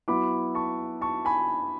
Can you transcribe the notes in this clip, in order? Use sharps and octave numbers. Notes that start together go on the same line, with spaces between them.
F#3 B3 E4 B5 D6
A5 C#6
A5 C#6
G#5 B5